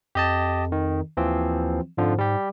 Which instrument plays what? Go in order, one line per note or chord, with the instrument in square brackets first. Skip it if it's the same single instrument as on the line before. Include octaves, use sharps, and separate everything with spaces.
[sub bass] F2 [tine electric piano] G4 D#5 A5
[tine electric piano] D#3
[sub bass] D#2 [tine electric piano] E3 F3 C4
[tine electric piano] F2 D3 F3 [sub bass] G#2
[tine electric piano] G3 G4